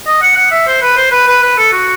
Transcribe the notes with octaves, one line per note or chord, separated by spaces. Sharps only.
D#5
F#5
F#5
E5
C5
B4
C5
B4
B4
B4
A4
F#4